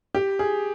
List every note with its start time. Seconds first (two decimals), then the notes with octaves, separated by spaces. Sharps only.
0.15 G4
0.39 G#4